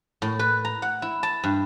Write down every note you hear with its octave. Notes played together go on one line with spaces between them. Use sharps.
A2
B4
A#5
F#5
E4
A5
G2